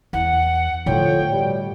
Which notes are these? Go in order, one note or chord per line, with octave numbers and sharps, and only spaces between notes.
E2 F#5
A2 D3 F3 A4 C#5 G5
B2 G3